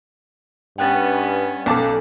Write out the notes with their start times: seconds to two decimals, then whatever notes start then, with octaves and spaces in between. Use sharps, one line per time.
0.78 G2 B3 C#4 G5 F#6 A6
1.66 B1 C#4 A4 A5 D6